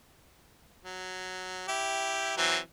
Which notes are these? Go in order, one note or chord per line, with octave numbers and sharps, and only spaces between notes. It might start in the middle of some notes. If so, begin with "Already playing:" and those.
F#3
E4 G4
E3 F#3 C4